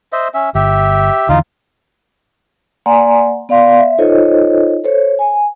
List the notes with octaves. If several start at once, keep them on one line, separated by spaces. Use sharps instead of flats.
C5 D#5 E5
C#4 E5
G1 G4 E5
E2 D3 E3 D#4 F4 F5
A#3 D5 F#5 G#5 A#5 C6
B3 D5 F5 C6
E5
D#4 F4 A4 C5 C#5 D#5
A4 C5 C#5
G#5